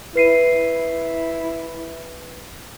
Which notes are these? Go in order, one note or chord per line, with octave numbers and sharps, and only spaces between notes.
E4 B4 C7 D#7